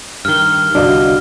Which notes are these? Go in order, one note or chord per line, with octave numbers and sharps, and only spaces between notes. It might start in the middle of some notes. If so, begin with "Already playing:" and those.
G2 D#3 F6 G7
G1 C2 D4 F#4 D#5 F5